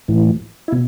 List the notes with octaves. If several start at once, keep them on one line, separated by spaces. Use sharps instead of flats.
A2 E3
E4
B2